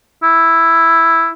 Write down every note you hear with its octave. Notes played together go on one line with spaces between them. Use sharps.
E4